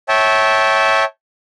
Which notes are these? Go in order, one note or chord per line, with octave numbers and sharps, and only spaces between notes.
C#5 E5 G5 A5